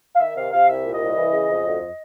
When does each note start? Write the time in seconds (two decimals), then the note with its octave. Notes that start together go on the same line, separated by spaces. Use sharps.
0.16 F5
0.20 D#3 E5
0.36 C3 F5
0.53 C3 F5
0.69 C2 E5
0.86 A#2
0.93 D#5
1.01 C2
1.17 E3
1.33 C#3
1.50 F2
1.66 D2